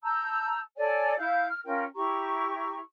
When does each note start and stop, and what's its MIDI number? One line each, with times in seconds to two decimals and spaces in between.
0.03 0.59 81
0.03 0.59 82
0.03 0.59 88
0.03 0.59 91
0.76 1.14 69
0.76 1.14 73
0.76 1.14 74
0.76 1.14 80
1.18 1.46 64
1.18 1.46 77
1.18 1.46 91
1.48 1.59 89
1.65 1.83 61
1.65 1.83 65
1.65 1.83 70
1.65 1.83 79
1.95 2.78 64
1.95 2.78 67
1.95 2.78 82
1.95 2.78 85